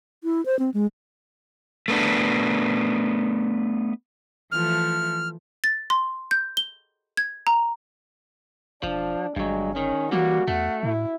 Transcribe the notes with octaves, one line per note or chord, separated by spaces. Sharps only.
E4
C5
C4
G#3
A3 B3 D4
E3 F3 A3 F6
A6
C6
G6
G7
G#6
A#5
E1 F3 D4
G1 G2 F#3 G#3
D#3 C#4
E3 G3 A#3 F#4
E2 A3 F#5
A2 E4